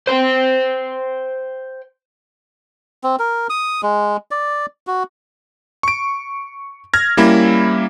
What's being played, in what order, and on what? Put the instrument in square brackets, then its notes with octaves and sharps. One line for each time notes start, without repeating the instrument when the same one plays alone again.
[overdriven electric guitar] C5 G5
[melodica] C4
A#4
D#6
G#3
D5
F#4
[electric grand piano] C#6 D7
F6 G#6 A#6
G3 A#3 C#4 E4